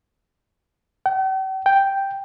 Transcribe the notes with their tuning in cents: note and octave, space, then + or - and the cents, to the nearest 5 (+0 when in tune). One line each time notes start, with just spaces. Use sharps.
G5 -45
G5 +0